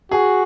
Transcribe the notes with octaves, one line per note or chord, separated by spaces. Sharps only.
F#4 G#4